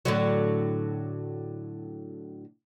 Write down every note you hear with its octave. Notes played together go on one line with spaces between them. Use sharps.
A2 D3 F#3